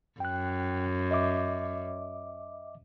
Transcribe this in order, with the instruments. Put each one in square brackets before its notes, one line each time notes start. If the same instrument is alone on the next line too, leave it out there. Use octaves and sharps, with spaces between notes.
[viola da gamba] F#2 [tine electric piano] G5 F#6
[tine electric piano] D#5 E5 D6